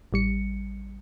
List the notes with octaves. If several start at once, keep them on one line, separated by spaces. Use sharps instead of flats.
A1 G3 C#7